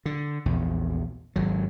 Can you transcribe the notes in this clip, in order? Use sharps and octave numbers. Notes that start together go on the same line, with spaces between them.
D3
A#1 E2
G#1 F#3